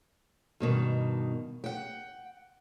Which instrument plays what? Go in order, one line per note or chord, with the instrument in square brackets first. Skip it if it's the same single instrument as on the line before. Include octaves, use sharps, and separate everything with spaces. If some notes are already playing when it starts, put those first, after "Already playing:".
[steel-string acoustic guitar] G2 B2 D#3
F#5 G5